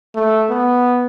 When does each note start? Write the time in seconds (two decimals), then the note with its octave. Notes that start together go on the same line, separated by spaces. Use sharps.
0.15 A3
0.50 B3